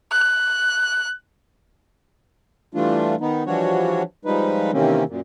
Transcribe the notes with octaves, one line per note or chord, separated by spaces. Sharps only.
F#6
E3 G3 A3 D4 F4
D#3 B3 D#4
E3 F3 G3 D4 F#4 C#5
F3 G3 G#3 D#4 B4
C3 D#3 E3 A#3 C4 C#4
F#2 A#2